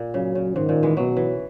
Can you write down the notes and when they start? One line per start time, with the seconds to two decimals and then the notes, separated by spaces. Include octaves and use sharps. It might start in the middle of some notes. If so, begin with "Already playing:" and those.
Already playing: A#2
0.14 C#3 F#3
0.35 C#3
0.56 G#2 D#3
0.69 A#2
0.83 E3 G#3
0.97 B2 F#3
1.17 E3